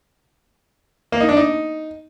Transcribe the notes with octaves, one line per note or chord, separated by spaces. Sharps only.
A#3
D#4
D4
D#4